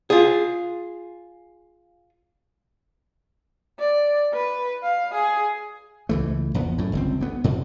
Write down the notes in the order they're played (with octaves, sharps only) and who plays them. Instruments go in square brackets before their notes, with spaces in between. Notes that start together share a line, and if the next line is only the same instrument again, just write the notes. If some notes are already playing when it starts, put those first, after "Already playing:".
[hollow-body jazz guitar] F4 G#4
[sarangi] D5
B4
F5
G#4
[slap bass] C#2 E3 A3
A#1 E2 B3
F#2 A2
G1 C#2 C4
D2 B3
F2 B2